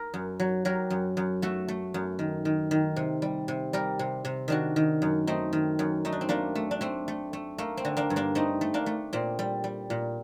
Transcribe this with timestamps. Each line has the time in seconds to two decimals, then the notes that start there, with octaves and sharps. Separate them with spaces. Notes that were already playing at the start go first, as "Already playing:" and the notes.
Already playing: A#4
0.14 F#2
0.40 F#3
0.65 F#3 G4 A#4
0.90 F#2
1.17 F#2
1.42 A3 F#4 A4
1.68 A3
1.94 F#2
2.19 D#3
2.45 D#3
2.71 D#3
2.96 C3
3.22 G3
3.48 C3
3.73 G3 G4 A#4
3.99 C3
4.25 C3
4.48 D#3 D4 F#4
4.76 D#3
5.02 F#2
5.27 A3 C4 D#4
5.53 D#3
5.79 F#2
6.05 A3 D#4
6.12 D4
6.21 C4
6.29 A3 A#3 D4
6.55 A3
6.71 D4
6.81 A3 C4
7.08 A3
7.33 A3
7.58 A3 A#3
7.77 C4
7.85 D3
7.97 A#3 D4
8.10 G2
8.16 A#3 D4
8.35 A3 C4 D#4
8.61 A3
8.74 A#3 D4
8.86 A3
9.13 A#2 C4
9.39 G3
9.64 G3
9.90 A#2